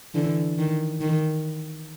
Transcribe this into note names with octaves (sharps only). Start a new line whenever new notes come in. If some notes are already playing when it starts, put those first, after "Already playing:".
D3 E3
D#3
D#3